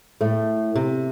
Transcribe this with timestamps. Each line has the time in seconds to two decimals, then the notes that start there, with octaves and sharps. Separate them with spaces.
0.21 A2 A3
0.76 C3